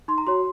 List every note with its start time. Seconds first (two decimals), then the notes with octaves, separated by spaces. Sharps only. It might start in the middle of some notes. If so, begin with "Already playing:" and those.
0.08 D#4 C6
0.18 A#5
0.27 F#4 C#5 C6